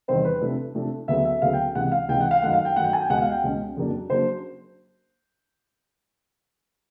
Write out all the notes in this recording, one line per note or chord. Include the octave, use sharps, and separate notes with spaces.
E2 C3 D#3 G3 C4 C5
B4
C3 F3 A3 D4
C3 F3 A3 D4
D2 C#3 F#3 B3 E5
E5
D2 C#3 F#3 B3 F5
G5
C#2 C3 E3 F#5
F5
C#2 C3 E3 G5
F#5
F5
F#2 D#3 F#3 A3 F#5
F5
G5
F#2 D#3 F#3 A3 F#5
G5
G#5
G5
C#2 B2 G#3 C#4 F#5
F5
G5
C#2 B2 G#3 C#4
F2 C#3 F#3 A#3 D4
C#3 F#3 A#3 D4 C5